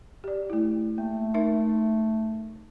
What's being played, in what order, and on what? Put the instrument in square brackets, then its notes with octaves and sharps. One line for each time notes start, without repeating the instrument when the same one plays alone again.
[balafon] G4 D5
A3 E4
[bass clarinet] A3 [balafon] A#3
[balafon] D#4 A#4 E5